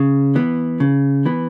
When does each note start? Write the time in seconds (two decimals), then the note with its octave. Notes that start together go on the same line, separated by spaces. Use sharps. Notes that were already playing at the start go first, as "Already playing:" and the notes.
Already playing: C#3
0.35 E3 B3
0.80 C#3
1.26 E3 B3